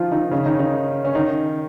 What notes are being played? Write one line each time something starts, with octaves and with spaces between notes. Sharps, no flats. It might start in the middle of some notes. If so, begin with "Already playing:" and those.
Already playing: D#3 F3 D#4 F4
D#3 D#4
C#3 C#4
D#3 D#4
D#3 D#4
C#4
D#3 D#4